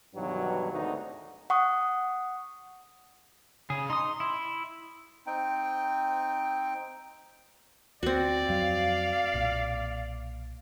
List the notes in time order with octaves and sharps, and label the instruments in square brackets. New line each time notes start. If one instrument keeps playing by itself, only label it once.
[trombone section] G2 B2 D#3 E3 F#3
G#1 D2 D#4 F#4
[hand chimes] F#5 C#6 D#6
[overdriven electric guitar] C#3 [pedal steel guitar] G#4
[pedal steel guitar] D#4 D#6 [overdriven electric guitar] C6
[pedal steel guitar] E4
[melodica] C4 D#4 G5
[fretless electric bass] D2 [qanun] C4 F#4 [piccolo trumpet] D5
[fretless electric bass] F2 F#3 [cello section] F5
[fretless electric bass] B1 A#2